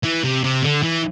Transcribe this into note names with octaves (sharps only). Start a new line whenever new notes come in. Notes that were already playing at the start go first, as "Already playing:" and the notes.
E3
C3
C3
D3
E3